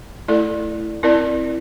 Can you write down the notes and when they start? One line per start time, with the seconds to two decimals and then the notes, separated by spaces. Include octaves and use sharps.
0.28 A3 E4 A4 D5
1.03 C4 E4 A#4 D5